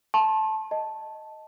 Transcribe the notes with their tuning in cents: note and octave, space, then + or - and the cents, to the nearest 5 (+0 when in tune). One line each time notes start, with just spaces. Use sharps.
A5 -10 C6 +45
D#5 +0 A5 +0